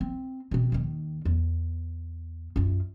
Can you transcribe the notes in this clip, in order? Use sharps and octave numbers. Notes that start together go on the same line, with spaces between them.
C4
B2 C4
D#2 D#3
E2
F#2 F4